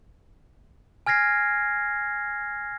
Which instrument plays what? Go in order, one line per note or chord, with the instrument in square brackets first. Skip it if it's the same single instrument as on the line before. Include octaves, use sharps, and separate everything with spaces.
[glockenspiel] G#5 F6 G#6 A#6 C7